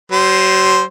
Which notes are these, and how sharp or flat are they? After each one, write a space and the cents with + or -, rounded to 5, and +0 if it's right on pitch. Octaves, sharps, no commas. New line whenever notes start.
F#3 +40 C5 +0